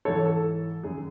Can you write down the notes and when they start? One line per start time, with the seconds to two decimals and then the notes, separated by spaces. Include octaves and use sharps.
0.05 G#2 E3 A4 C#5
0.25 A4
0.83 F#2 D#3 G#4